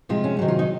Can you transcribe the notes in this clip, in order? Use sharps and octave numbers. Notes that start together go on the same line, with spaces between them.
C3 F3 G#3 F4
C#4
C3 D#3 F#3 F#4
F4
D#4